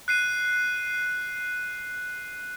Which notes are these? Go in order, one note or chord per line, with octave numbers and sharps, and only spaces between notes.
F#6 C7 D#7